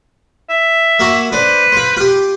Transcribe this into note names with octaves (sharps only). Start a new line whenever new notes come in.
E5
A#3 F#4 G#5
D4 B4 C5
F4 C5
F4 G4